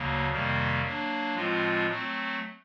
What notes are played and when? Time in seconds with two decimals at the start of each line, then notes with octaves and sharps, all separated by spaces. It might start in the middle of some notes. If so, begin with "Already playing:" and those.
Already playing: D2 C#3 F#3 A#3
0.30 F2 C3 D#3 G3 A#3
0.82 F#3 A#3 D4
1.34 A2 F3 G#3 C4 F4
1.87 F#3 A3 C4